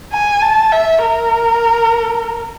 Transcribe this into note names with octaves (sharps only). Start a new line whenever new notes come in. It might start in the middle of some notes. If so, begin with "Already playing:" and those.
G#5
A5
E5
A#4